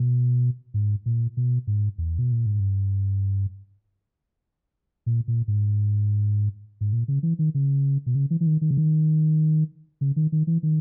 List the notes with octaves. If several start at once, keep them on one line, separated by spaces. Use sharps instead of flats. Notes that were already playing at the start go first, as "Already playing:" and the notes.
Already playing: B2
G#2
A#2
B2
G#2
E2
B2
A#2
G#2
G2
A#2
A#2
G#2
G#2
A#2
C#3
E3
D#3
C#3
B2
C#3
E3
E3
D#3
D#3
C#3
D#3
C#3
D#3
D#3
E3
D#3